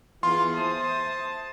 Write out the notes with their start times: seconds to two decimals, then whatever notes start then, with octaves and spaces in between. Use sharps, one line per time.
0.23 E3 B3 F4 G#4 C6
0.57 C5 E5 A5 D#6